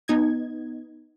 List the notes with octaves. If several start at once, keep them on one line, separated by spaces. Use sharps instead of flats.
B3 D#4 D#5 G#6